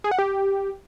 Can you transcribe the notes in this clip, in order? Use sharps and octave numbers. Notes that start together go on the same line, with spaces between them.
G#4
F#5
G4